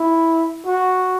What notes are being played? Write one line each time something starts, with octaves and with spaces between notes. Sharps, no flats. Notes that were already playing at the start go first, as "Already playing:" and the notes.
Already playing: E4
F#4